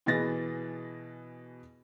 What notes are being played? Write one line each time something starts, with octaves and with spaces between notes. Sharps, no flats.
B2 E3 G#4 B4 A6 A#6